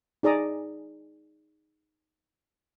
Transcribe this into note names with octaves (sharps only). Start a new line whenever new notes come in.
D#4 G#4 D5 A#5 D#6